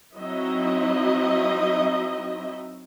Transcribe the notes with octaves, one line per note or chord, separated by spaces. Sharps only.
F#3 C4 D#4 E4 D#5 E5